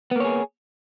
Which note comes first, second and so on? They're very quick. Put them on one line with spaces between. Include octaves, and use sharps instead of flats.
B3 A#3 C#5 G#4